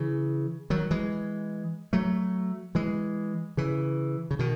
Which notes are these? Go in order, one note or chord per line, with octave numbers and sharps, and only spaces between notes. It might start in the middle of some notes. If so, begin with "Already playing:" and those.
Already playing: C#3 E3
D#3 F#3
E3 G#3
F#3 A3
E3 G#3
C#3 E3
C#3
B2 D#3